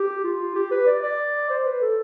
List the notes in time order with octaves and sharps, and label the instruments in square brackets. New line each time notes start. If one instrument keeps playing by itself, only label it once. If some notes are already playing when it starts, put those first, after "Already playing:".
Already playing: [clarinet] G4
F4
G4
B4
D5
D5
C5
B4
A4